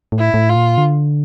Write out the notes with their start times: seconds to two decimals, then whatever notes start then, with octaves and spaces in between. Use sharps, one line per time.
0.12 A2
0.19 E4
0.34 A2
0.49 F4
0.56 A#2
0.78 D3